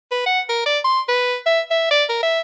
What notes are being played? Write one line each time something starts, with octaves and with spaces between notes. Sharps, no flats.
B4
F#5
A#4
D5
C6
B4
E5
E5
D5
A#4
E5